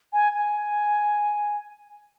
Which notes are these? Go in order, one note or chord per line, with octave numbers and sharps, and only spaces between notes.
G#5
G#5